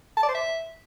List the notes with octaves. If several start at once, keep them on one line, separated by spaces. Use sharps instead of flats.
A5
D5
C5
E5